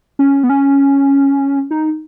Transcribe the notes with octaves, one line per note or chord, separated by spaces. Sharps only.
C#4
B3
C#4
D#4